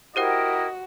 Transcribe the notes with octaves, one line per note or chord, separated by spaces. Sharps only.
E4 F#4 G4 A#4 C5 D#5 F#5 G5